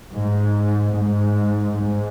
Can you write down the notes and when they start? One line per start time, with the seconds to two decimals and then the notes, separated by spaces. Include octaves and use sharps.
0.13 G#2
0.95 G#2
1.75 G#2